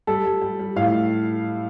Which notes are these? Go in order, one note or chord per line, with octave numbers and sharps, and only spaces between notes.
G3 A4
G3
G3
G3
A2 F5